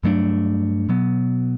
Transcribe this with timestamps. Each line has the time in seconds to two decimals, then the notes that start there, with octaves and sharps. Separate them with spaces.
0.03 G2 F#3 A3 D4
0.89 B2 F#3 B3